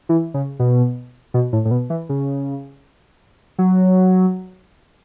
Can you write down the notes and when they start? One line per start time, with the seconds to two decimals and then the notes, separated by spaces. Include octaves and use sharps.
0.09 E3
0.34 C#3
0.59 B2
1.34 B2
1.53 A2
1.65 A2
1.71 B2
1.90 E3
2.09 C#3
3.58 F#3